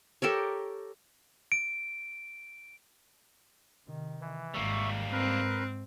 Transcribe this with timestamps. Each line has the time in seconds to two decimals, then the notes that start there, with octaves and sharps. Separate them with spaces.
0.22 G4 A4 A#4 C#5
1.52 D7
3.86 C3 D#3
4.21 E3
4.54 G#1 G3 A#3 E5 C#6
5.12 G#2 C4 A#4 B4